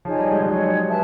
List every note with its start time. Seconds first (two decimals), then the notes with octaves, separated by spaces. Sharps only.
0.05 F3 D#4 G#4 C#5
0.19 G3
0.32 G#3
0.46 F#3 D#4 G#4 C#5
0.87 G#4 B4 E5 A5